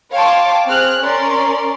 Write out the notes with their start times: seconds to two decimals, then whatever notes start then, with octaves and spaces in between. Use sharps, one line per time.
0.13 C#5 F5 G5 A5 C6 D6
0.67 C4 G#4 F6 F#6
1.02 C#4 A#4 D5 C6